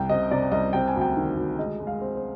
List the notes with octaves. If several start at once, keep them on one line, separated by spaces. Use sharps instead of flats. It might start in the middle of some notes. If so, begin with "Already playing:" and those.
Already playing: C2 G5
C3 D#5
C3 D5
C2 D#5
C3 G5
G#5
D2
G5
D#3
D2
G#3 D#5
G#3
F5
C4
C5